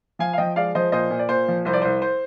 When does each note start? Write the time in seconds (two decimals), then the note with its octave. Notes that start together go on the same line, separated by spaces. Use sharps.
0.19 F3 F5 G#5
0.33 F5
0.38 F3 D#5 G5
0.56 G#3 D5 F5
0.75 F3 C5 D#5
0.92 A#2 C5 D#5
1.10 A#2
1.19 D5
1.29 A#2 C5
1.48 F3
1.65 C2 C5
1.73 D5
1.82 C2 C5
2.02 C5